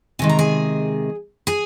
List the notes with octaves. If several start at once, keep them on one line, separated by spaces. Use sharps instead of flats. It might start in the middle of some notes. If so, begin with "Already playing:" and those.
C3 D#3 G#3 G#5
A#5
G#4 G#5
G#4 G#5